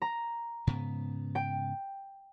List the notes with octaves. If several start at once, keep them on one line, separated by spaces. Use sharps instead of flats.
A#5
G#2 C#3 B3
G5